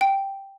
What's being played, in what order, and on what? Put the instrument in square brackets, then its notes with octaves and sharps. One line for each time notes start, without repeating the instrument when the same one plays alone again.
[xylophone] G5